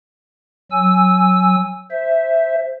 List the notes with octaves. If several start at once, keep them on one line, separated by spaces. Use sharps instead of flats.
F#3 G#5 E6
C5 E5